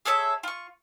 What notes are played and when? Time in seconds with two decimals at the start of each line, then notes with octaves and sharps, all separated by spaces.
0.05 G#4 A4 C#5 E5
0.43 F4 C#6